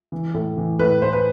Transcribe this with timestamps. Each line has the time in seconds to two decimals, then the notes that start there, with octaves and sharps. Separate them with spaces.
0.12 E3
0.34 A2
0.57 E3
0.79 A2 B4
1.02 A2 C5
1.13 B4